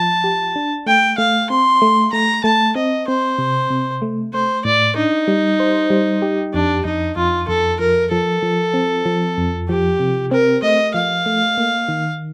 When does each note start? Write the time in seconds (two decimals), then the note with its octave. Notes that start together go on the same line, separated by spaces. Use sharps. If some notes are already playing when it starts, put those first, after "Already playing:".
Already playing: F3 A5
0.24 G4
0.56 D4
0.86 A3 G5
1.18 A3 F5
1.50 C4 C6
1.82 A3
2.13 A3 A#5
2.44 A3 A5
2.75 C4 D#5
3.08 C4 C5
3.38 C3
3.70 C3
4.02 A3
4.33 A3 C5
4.65 A2 D5
4.97 D4 D#4
5.28 G3
5.60 C5
5.90 G3
6.22 G4
6.54 F2 D4
6.85 F2 D#4
7.16 F2 F4
7.48 F2 A4
7.79 F3 A#4
8.12 F3 A4
8.42 F3
8.74 C4
9.06 F3
9.38 F2
9.69 F3 G4
10.00 C3
10.31 C4 A#4
10.62 A3 D#5
10.94 F3 F5
11.26 A3
11.58 A#3
11.89 D#3